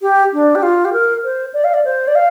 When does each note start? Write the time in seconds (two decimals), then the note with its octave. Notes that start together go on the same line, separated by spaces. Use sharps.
0.01 G4
0.33 D4
0.55 G4
0.62 F4
0.84 G4
0.92 A#4
1.24 C5
1.53 D5
1.64 F5
1.73 D5
1.84 C5
2.07 D5
2.15 F5